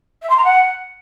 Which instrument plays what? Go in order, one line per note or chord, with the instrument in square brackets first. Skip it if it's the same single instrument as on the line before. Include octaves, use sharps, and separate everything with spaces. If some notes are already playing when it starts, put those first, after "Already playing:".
[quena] E5
C6
A#5
F#5